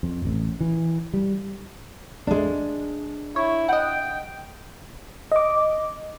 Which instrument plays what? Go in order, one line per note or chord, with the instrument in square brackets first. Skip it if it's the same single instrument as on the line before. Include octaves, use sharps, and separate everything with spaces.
[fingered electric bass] F2
A1
E3
G3
[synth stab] A1 [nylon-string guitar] G#3 D4
[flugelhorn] E4 [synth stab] C#5
[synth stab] D#5 F#5 [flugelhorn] G5
[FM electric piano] D#5 D6